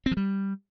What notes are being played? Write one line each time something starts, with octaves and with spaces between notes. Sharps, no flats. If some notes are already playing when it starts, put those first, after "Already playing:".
C4
F3
G3